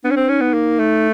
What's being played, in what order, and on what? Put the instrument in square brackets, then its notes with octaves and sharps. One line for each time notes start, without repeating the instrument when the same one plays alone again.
[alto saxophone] B3 [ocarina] D4
[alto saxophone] C#4
C4
[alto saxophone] C#4 [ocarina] D#4
[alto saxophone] B3
A#3
A3